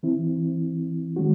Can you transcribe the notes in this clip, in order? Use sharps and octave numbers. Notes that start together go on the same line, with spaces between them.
E3 C4 E4
D#3 G#3 C#4 F#4